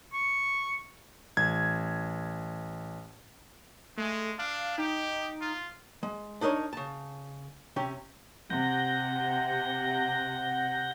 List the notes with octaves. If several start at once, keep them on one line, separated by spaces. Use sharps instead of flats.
C#6
A1 G#6
G#3 A3
D4 F5
D#4 G4
F4
G#3
D4 D#4 A#4 C5 C#5
C#3 A5
C3 C#4 G4
C3 F#5 G6 A#6